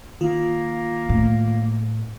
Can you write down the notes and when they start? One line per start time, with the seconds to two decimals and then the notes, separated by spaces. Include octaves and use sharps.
0.21 D#3 A#3 F4
1.09 A2